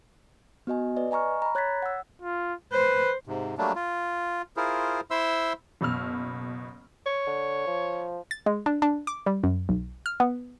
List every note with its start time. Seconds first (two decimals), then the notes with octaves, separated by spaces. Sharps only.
0.67 B3 F#4 D#5 G#5
0.96 B4 D5 D#5
1.11 D#5 G#5 A#5 C#6 F6
1.42 A#5 B5
1.55 C#5 F#6 G#6 A6 B6
1.82 F#5 E6
2.22 F4
2.73 B4 C5
3.26 G#2 C3
3.58 F#3 G3 A3 A#3 D4
3.76 F4
4.57 E4 F4 G#4 A#4 C5
5.11 E4 C5 E5 C6 E6
5.81 F#1 B2 E6 F6
7.06 C#5
7.27 D3
7.67 F3
8.31 A6
8.46 G#3
8.66 D4
8.82 D4
9.07 D6
9.26 G3
9.44 F#2
9.69 B1
10.06 F6
10.20 B3